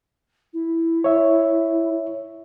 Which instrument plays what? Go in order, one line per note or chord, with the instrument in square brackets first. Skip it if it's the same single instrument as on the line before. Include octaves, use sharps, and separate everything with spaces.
[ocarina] E4
[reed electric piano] C#5 E5